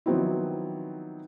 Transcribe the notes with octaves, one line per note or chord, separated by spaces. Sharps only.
D#3 F3 F#3 B3 C4 E4